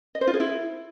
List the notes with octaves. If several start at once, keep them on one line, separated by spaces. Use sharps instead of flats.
D#5
C5
F4
G#4
E4